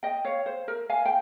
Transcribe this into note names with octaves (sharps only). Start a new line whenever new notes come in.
D#5 G5
C#5 F5
C5
A#4
F5 G#5
G5